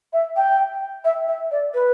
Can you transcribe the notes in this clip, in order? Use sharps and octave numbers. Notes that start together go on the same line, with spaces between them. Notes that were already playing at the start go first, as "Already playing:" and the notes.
E5
G5
E5
E5
D5
B4